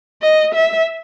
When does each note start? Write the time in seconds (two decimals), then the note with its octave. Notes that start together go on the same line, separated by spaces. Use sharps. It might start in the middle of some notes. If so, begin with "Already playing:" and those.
0.22 D#5
0.55 E5